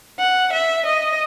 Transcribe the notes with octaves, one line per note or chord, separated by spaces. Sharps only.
F#5
E5
D#5